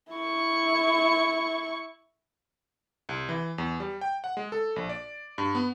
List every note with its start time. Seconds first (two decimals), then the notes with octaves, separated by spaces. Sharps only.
0.13 E4 C#6
3.09 C2
3.29 E3
3.58 E2
3.80 G3
4.01 G5
4.24 F#5
4.37 G#3
4.52 A4
4.76 A#1
4.89 D5
5.38 G2
5.55 B3